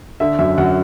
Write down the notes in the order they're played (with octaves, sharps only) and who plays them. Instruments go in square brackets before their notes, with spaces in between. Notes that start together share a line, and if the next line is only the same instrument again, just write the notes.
[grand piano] D3 E5
F#2 E5
F#2 F#5